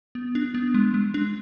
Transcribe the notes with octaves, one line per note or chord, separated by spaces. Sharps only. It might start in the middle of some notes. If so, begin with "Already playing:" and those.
B3
D4
B3
G#3
G#3
D4